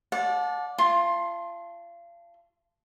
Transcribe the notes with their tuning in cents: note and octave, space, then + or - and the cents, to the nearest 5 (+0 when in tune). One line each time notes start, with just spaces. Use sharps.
D5 +0 F#5 -40 A5 -25
F4 -35 A5 +0 C6 +15